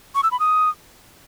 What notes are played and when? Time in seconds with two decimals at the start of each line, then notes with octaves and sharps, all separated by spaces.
0.15 C#6
0.23 E6
0.31 B5
0.40 D#6